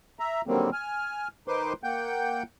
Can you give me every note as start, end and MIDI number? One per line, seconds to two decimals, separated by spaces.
0.19 0.41 76
0.19 0.41 82
0.47 0.70 50
0.47 0.70 51
0.47 0.70 54
0.47 0.70 55
0.47 0.70 58
0.47 0.70 60
0.73 1.28 80
0.73 1.28 89
1.48 1.73 51
1.48 1.73 63
1.48 1.73 71
1.48 1.73 72
1.48 1.73 84
1.48 1.73 86
1.83 2.43 58
1.83 2.43 78
1.83 2.43 79
1.83 2.43 91